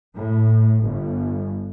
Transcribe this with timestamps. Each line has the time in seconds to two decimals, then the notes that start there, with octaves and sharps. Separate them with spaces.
0.15 A2
0.84 G1